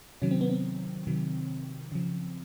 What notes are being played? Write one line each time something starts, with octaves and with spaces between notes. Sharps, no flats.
C3 D#3 F#3 C#4
C4
B3
C4
C3 D#3 F#3
C#3 F3